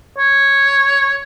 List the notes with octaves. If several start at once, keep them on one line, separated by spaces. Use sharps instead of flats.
C#5